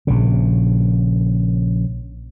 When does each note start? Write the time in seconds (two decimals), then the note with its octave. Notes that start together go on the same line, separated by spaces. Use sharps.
0.07 A#1 C#3